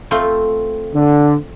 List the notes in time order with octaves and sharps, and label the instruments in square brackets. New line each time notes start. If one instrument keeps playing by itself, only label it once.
[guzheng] A3 C4 F4
[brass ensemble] D3